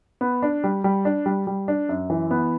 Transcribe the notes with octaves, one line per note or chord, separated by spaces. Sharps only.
B3
D4
G3
G3
D4
G3
G3
D4
F#2
E3
B3